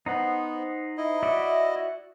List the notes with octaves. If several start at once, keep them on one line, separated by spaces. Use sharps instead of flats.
B3 D#4 C5 F#5
E4 D#5
F#4 D5 E5